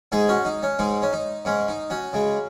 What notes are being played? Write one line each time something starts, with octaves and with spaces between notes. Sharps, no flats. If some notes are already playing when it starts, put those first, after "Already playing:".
G#2 G#3 D#4 G#4
C#4 F#4
D#4
C#4
G#2 G#3 D#4
C#4
D#4
G#2 G#3 C#4
D#4
C#4 F#4
C#3 G#3